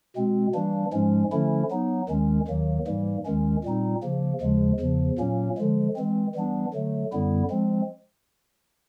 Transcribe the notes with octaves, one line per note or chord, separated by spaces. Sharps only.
B2 G#3 C4
E3 G3 A#3 D4
G#2 F3 G#3 C#4
D3 F3 A3 C#4 E4
F#3 B3 D#4
D#2 D#3 G#3 C#4
D#2 D#3 F#3 A#3
G#2 E3 G3 A#3
D#2 D#3 G#3 C#4
A#2 G3 C4 D#4
C#3 F3 A#3
D#2 C#3 F3 G#3
E2 C#3 F3
A#2 F#3 A#3 C#4
D3 F3 G#3
E3 G#3 C4
E3 G3 B3 D4
D3 F#3 A3
F#2 D3 G3 B3 E4
F3 G#3 C4